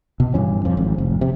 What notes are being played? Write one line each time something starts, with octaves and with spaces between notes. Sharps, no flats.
B2
G2 E3 C#4
F2 F3
G#1
F1
C3